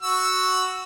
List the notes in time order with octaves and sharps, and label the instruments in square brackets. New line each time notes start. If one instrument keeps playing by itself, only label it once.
[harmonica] F#4 E6